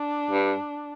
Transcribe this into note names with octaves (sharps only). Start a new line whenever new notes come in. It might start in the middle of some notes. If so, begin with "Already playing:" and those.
Already playing: D4
G2